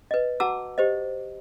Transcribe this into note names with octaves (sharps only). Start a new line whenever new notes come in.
B4 D#5
F#4 F#5 A5 A#5 D6 E6
G4 C5 D#5